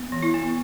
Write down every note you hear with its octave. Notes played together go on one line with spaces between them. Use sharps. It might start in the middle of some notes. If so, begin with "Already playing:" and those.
Already playing: B3
E3
E4
B3